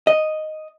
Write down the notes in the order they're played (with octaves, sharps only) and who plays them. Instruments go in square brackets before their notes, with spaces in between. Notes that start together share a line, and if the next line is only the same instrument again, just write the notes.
[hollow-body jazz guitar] D#5